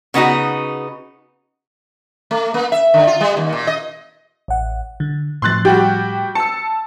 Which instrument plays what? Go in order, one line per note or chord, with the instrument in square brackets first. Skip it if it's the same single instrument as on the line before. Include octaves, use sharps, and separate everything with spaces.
[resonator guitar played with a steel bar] C#3 B3 D#4 F#4
[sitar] A3
A#3
E5
D3
F4
G3
D#2
A#2
D#5
[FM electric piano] A1 F#5
D3
[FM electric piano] A2 F3 [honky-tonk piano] C6 F#6 A6
[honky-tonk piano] G3 F#4 G4
[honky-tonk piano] A5 E6 [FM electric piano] C#7